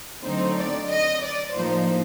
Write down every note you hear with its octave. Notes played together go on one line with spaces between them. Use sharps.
D3 F#3 A3 C4 D#4 C5
D5
D#5
D5
A2 F3 A#3 D#4 C5